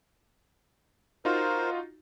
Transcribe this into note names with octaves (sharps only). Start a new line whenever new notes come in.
D#4 F4 F#4 A#4 C5